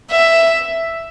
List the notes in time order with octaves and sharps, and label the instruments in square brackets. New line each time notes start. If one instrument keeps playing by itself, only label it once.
[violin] E5